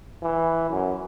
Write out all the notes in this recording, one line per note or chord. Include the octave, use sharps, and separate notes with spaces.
E3
F#2